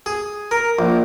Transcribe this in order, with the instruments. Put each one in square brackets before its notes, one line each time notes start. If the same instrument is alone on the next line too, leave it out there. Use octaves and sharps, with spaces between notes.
[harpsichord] G#4
A#4
A#1